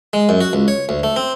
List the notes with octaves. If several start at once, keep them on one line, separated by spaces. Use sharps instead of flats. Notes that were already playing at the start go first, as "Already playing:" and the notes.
G#3
F#2
F#4
C#2
C#5
D2
A3
C4